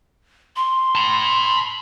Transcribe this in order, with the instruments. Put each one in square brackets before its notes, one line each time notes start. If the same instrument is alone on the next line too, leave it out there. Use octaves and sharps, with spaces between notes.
[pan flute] C6
[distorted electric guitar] A5 B5